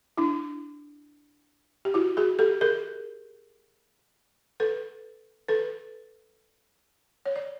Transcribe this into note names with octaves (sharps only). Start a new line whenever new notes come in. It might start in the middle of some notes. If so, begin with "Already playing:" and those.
D4 E4
G4
E4 F#4
F#4 G#4
G4 A4
G#4 A#4
A4 B4
A4 B4
C#5
D5